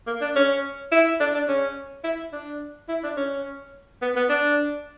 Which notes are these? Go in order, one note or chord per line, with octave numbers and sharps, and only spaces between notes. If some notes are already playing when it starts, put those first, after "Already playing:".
A#3
D4
C#4
E4
D4
D4
C#4
E4
D4
E4
D4
C#4
B3
B3
D4